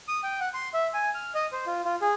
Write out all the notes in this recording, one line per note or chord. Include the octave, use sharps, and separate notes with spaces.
D#6
G5
F#5
C6
E5
G#5
F6
D#5
C5
F4
F4
G#4